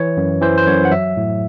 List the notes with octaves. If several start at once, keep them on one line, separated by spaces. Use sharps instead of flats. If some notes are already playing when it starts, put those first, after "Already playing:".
Already playing: E3 C#5
F#2
E3 C5
C5
F#2 C#5
F#5
F#3 E5
A2